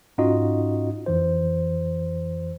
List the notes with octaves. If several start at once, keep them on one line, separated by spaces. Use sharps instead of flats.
G#2 C#4 D#4 F4 F#4 D#5
F2 E3 C5